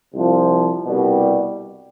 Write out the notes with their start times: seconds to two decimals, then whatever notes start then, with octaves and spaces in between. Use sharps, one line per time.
0.13 C2 C3 F3
0.85 C2 B2 G3